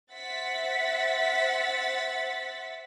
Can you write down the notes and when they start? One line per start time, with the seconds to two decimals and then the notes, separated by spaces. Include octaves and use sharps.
0.12 C5 E5 F#5 A6 B6